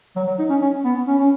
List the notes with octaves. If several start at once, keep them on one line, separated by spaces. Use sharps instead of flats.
F#3
F#3
D#4
C#4
C#4
B3
C#4
C#4